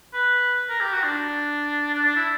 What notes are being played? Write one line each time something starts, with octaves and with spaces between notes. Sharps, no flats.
B4
A#4
G4
F#4
D4
D4
D4
E4